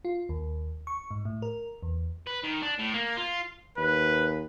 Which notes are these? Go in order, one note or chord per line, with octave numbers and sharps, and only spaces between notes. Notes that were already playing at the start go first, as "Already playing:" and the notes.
F4
D#2
C#6
G#2
A2
A#4
E2
B4
D#3
D4
A2
A#3
F4
D#2 B4